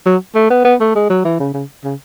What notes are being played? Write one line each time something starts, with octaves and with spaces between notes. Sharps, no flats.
F#3
A3
B3
B3
A3
G#3
F#3
E3
C#3
C#3
C#3